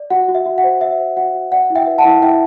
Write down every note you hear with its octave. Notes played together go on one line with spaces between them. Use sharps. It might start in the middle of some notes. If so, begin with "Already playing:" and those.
Already playing: D5
F#4 F#5
F#4
E5
F#4
F#5
C5
C5 E5
C5
F#4 F#5
F#4
D5 F#5
E4
E5 G5
B4
F#5 A5
E4
E4 E5 G5